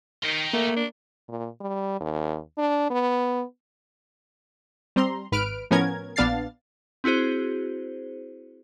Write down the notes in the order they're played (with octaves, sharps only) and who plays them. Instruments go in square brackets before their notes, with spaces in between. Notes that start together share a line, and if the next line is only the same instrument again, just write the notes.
[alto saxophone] D#3 [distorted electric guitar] A#4 G5
[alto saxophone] A3 [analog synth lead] A#3
[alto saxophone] D4
[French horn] A#2
G3
D#2
D4
B3
[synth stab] G3 C4 A#5 C6
G#1 B4 F6 D7
A2 F3 B3 C#4 A#4 G#6
A#1 B3 D4 F5 A6 C7
[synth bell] C4 E4 F#4 G#4 C5